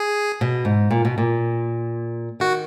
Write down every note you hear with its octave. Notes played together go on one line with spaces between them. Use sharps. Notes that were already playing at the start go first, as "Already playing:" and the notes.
Already playing: G#4
B2
G#2
A#2
B2
A#2
D#3 F#4